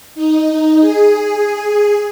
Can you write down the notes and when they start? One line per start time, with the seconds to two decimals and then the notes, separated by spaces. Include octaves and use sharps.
0.15 D#4
0.81 G#4